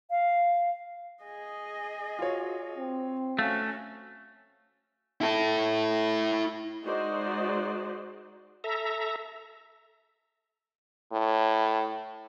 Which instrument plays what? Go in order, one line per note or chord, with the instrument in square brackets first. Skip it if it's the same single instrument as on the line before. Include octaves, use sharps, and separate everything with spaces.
[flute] F5
[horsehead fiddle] G#4 D#5
[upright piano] F4 C#5 [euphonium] F#4
[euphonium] C4
[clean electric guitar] A3 [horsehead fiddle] C#4 F#4 [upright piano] F5
[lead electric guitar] E4 A4
[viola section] G#3 D#4 F#4 C5 D5 D#5
[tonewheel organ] A4 E5 A#5
[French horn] A2